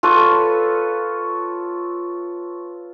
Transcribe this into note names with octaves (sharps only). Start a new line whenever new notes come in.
F4 A4 B4 C#5